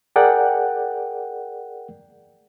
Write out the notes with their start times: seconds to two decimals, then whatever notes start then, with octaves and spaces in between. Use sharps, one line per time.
0.16 G#4 A#4 D5 F#5 G5